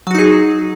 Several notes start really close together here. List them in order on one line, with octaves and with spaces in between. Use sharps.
F#3 F#4 D#4 G#4